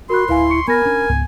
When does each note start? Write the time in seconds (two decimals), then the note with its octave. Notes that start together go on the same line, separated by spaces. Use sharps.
0.10 F#4 A#4 B5 C6 F#6
0.29 D1 E4 B4 F5 G#5
0.50 C#6 C#7
0.68 B3 A#4 G#5 B5 A#6
0.85 C#4 D4
1.09 C#2 G#2 B3